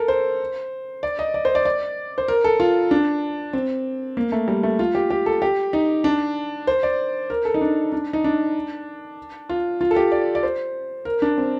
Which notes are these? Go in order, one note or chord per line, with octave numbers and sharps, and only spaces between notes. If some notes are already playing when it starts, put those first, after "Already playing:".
Already playing: A4 A#4
C5
D5
D#5
D5
C5
D5
D5
C5
A#4
A4
F4
D4
C4
A#3
A3
G3
A3
F4
G4
G4
A4
G4
D#4
D4
C5
D5
A#4
A4
D#4
D4
D4
D#4
D4
F4
F4
A4
G4
D5
D5
C5
A#4
D4
C4